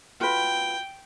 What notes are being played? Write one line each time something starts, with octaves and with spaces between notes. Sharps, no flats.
F4 F#4 B4 G5